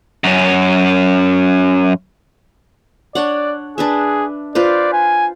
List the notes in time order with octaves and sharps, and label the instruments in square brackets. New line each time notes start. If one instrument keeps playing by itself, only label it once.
[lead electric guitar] F#2 C#4
[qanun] D4 C#5 F#5 [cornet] D5
[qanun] D4 B4 E5 [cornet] G#4
[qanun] F4 B4 C5 [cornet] D5
[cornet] G#5